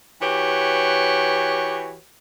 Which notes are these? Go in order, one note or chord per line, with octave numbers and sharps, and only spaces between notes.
E3 F#4 G4 B4 C#5